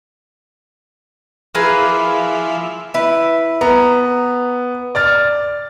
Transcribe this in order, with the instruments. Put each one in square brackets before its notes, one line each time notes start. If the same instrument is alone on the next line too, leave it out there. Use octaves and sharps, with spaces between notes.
[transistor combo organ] F3 E4 [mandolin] A#3 G#4 B4
[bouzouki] E4 B4
[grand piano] B3 [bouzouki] A#5
[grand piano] D5 F6 A6